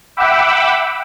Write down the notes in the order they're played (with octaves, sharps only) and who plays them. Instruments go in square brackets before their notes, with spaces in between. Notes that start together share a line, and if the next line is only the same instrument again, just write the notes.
[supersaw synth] E5 F#5 G5 B5 D6 E6